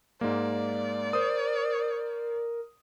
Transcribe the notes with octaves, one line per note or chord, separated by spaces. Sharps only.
G#2 G#3 A#3 D5
A#4 C5 D#6